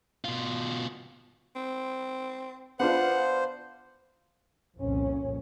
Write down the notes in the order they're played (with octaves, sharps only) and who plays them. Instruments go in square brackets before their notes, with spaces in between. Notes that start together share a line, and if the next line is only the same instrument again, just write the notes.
[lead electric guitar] B2 F4
[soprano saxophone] C4
[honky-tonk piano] B3 D4 F4 [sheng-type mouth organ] C5 [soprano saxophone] F#5
[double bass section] C2 F2 A#2 C#4